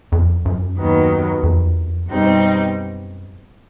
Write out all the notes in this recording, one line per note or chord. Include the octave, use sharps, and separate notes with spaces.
F2
F#2
D#2 D#3 F#3 B3
F2
E2
F2
F#2 B2 G3 C4 D#4